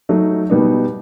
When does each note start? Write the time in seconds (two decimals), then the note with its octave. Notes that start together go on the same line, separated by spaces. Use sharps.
0.09 F#3 A3 D#4
0.50 B2 G3 B3 D#4